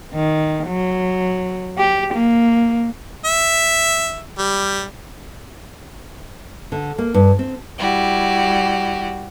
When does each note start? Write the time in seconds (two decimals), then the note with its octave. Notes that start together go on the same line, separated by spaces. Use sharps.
0.14 D#3
0.68 F#3
1.78 G4
2.14 A#3
3.25 E5
4.38 G3
6.72 D3
6.98 A#3
7.14 G2
7.39 C4
7.78 G3 E4 F#4 G4